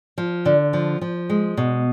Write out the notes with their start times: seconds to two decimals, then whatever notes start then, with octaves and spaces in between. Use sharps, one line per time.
0.18 F3
0.45 D3
0.73 F3
1.01 F3
1.30 G#3
1.57 B2